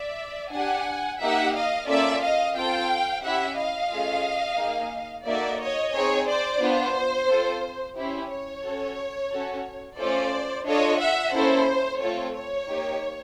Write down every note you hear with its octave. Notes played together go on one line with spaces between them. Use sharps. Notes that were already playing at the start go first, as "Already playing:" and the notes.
Already playing: D5 E5
D4 G4 F#5 G#5
A#3 D#4 G4 E5 F#5
D#5 F5
A#3 C#4 F4 A4 D5 E5
D#5 F5
C4 F4 A4 F5 G5
C#4 E4 G4 E5 F#5
D#5 F5
A3 C#4 F4 G#4
A#3 D#4 G#4
A#3 D#4 F#4 A4 D5 E5
C#5 D#5
C4 D#4 G#4 C#5
C5 D5
B3 D4 F4 C5
C4 F4 A4
C#4 E4 G4 C5
C#5
C#4 F#4 A4
C#4 F#4 A4
A3 C#4 F4 A4 C5 D5
D4 F4 A4 C#5 D#5
E5 F#5
A#3 C#4 E4 A4 C5
A3 C4 F4 A4 C#5
C#5
A#3 D#4 G4